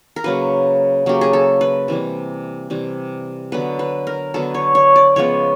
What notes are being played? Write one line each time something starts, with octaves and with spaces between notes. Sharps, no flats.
A#4
C#3 F#3 A#3 B4
C#3 F#3 A#3 G4
G#4
A4
B4
C3 E3 G3
C3 E3 G3
D3 F#3 B3 B4
B4
A#4
D3 F#3 B3 A4
C#5
C#5
D5
C#3 F3 G#3 B3 C#5